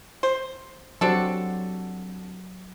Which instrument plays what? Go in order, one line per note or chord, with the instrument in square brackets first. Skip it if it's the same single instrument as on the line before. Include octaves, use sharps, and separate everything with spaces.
[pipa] C5
[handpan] F#3 F#4 G4 [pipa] C4 D4 A4